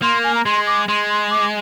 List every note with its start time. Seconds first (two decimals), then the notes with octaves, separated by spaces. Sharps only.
0.02 A#3 C6
0.24 G#5
0.35 A#5
0.45 G#3 C6
0.67 D6
0.88 G#3 C6
1.09 C6
1.30 D6